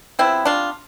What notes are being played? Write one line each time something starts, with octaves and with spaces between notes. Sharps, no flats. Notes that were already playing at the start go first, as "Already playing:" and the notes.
C3 F3 B3 C4 E4
D4 F4